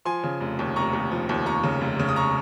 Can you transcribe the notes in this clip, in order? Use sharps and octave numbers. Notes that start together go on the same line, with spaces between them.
F3 G#5 C6
C#3
F1
D#2
F1 A#5 C#6
D#2
F3
D#2
D#2 A#5 C#6
C#3
F1
C#3
D#6
A#5 C#6